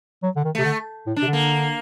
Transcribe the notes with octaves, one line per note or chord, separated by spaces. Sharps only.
F#3
D3
D#3
C3 A3
D3
A2
D4
C3
D3
A#3